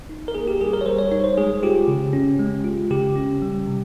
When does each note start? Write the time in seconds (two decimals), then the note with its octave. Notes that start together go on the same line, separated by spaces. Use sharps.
0.09 D#4
0.28 A#4
0.35 A#3 G#4
0.48 G4
0.61 G3 G#4
0.73 A#4
0.81 C#5
0.86 G3 C5
0.98 C#5
1.12 D#4 C#5
1.24 C5
1.38 G#3 G#4
1.63 F4 G4
1.88 C#3
2.13 C#4
2.39 G#3
2.64 F4
2.91 C#3 G4
3.16 C#4
3.42 G3
3.67 C3